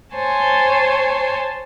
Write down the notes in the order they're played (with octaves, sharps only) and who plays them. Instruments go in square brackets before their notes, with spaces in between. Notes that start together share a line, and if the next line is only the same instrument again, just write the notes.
[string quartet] C5 C#5 G#5 A5